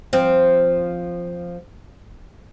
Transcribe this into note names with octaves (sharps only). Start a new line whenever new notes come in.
F3 C4